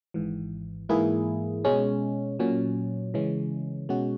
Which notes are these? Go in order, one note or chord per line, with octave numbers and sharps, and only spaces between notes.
G#1 G#2 E3
G#2 E3 A#3 E4 G#4
B2 G#3 C#4
A#2 F#3 C#4
C#3 E3 G#3 C#4
B2 G#3 C#4 F#4